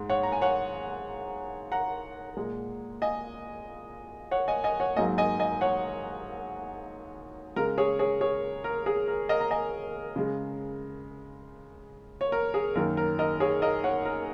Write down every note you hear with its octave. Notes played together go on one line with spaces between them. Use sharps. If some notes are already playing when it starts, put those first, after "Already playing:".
Already playing: G#2 G#3
C#5 F#5
A#5
G#5
C#5 F#5
F#5 A#5
A#2 G#3
D#5 G#5
C#5 F#5
D#5 G#5
D#5 G#5
C#5 F#5
G#2 F#3 A#3 D#5 G#5
D#5 G#5
D#5 G#5
C#5 F#5
C#3 G#3 A#4
G#4 C#5
G#4 C#5
G#4 C#5
A#4
G#4
A#4
A#4 D#5
A#5
D#5 G#5
C#3 G#3
C#5
A#4
G#4
F#2 D#3 A#3 A#4
A#4
A#4 D#5
G#4 C#5
A#4 D#5
C#5 F#5
A#4